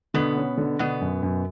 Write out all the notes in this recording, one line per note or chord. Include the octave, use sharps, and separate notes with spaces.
B2 D3 B3
C#4
D3
B2 D3 B3
F#2
F#2